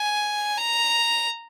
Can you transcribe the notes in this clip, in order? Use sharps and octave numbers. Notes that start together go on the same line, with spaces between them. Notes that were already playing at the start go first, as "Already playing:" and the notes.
Already playing: G#5
A#5